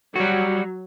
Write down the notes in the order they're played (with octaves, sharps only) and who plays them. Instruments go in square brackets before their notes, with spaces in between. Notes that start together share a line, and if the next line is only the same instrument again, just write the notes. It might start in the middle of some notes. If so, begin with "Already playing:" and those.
[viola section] F#3 [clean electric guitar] G3 F#4